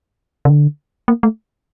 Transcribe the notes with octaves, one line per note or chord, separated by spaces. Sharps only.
C#3
D3
A#3
A3